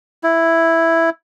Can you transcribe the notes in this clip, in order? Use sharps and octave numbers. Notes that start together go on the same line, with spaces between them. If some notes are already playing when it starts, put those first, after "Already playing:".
E4